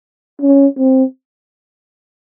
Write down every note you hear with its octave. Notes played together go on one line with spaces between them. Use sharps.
C#4
C4